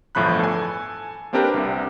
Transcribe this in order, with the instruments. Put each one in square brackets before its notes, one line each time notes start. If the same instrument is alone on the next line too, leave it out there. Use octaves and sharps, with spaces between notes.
[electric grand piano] G1 E2 A2 F3 B5 F#6
A4 G#5
A#3 C4 D4 G4 A#4 B4
C2 C3